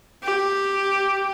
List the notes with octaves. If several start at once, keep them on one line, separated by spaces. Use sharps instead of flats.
G4